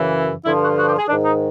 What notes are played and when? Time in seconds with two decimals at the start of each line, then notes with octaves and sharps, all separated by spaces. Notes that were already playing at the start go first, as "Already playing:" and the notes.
Already playing: F#2 C#3 E3
0.45 G2 D3 F3 E4
0.61 F#4
0.77 F#4
0.87 G4
0.98 G#4
1.08 G#2 D#3 D4
1.25 D#4